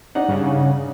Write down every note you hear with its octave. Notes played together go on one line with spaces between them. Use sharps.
D4 D#4 F#5
G2 C#3